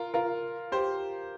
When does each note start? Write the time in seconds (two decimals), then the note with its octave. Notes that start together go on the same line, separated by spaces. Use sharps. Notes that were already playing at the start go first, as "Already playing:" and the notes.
Already playing: F4 A#4
0.14 F4 A#4
0.72 G4 C5